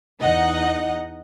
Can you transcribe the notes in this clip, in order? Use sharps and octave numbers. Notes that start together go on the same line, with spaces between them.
E2 D#4 D#5 F#5